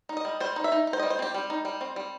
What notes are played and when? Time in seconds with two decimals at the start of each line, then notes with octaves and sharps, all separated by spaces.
0.09 D#4
0.17 D#5
0.25 G3
0.40 G3 C5
0.56 D#4
0.64 E5
0.72 D#4
0.87 D#4
0.93 C5
0.99 D#5
1.03 G3
1.10 C5
1.19 C4 G4
1.34 G3
1.50 D#4
1.65 G3
1.81 C4
1.96 G3